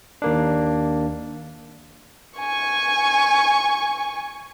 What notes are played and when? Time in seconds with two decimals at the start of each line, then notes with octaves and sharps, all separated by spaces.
0.22 D#2 A#3 D4
2.38 G#5 C#6